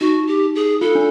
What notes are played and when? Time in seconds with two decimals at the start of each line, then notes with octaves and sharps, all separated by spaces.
0.01 D#4 F#4
0.27 G4
0.55 G#4
0.81 F4 A4
0.95 D4